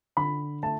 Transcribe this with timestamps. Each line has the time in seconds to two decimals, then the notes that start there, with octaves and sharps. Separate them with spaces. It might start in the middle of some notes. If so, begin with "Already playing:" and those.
0.17 D3 B5
0.63 A3 A5